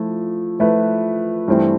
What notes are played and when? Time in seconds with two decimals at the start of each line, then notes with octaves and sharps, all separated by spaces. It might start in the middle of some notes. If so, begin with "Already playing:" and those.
Already playing: F3 A3 E4
0.59 F3 A3 E4 B4
1.48 G2 E3 A3 C4